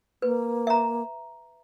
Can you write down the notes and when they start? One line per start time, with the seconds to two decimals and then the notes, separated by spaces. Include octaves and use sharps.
0.22 A#3 B4
0.67 E5 A#5